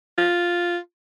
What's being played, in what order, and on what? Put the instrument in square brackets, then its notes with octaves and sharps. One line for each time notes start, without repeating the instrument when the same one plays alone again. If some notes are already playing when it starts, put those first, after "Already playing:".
[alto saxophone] F4